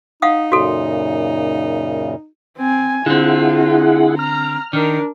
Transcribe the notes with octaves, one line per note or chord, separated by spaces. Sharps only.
D#4 F5 F#5 D#6
F#2 A#2 C#3 F#4 A4
C4 G#5
D3 C4 E4 F4 G#4 F#5
A#5 F6
D#3 D4 A#4